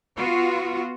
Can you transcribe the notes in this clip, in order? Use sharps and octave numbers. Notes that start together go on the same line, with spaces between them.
B3 F4 F#4